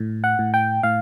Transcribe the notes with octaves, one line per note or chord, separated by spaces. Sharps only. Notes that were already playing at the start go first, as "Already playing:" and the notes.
Already playing: A2
F#5
A2
G5
A2 F5